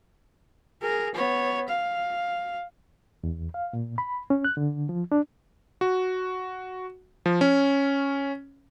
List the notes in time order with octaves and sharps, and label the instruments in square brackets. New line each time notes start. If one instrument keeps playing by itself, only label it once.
[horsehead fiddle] G#4 A#4
B3 C#5
F5
[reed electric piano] E2
F5
A#2
B5
C#4
F#6
D3
F3
D4
[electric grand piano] F#4
F3
C#4